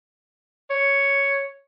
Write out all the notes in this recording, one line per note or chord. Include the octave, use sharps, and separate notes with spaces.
C#5